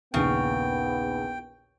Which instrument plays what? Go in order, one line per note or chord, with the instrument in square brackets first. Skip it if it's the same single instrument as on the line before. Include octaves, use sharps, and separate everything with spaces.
[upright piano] A#1 D#2 [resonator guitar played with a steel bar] C#3 [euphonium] B3 [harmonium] G5